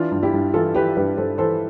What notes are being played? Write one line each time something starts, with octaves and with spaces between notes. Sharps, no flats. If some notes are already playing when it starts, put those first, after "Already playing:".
Already playing: E3 D4 F4
G2
E4 G4
G2
E3 F4 A4
E3 G4 B4
G2 G4 B4
G2 A4 C5
E3 A4 C5